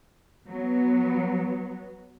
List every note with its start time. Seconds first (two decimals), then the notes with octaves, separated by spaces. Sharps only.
0.47 F#3 B3